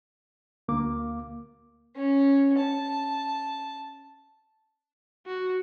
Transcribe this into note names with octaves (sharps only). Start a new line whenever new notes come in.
D2 A#3 D6
C#4
A5
F#4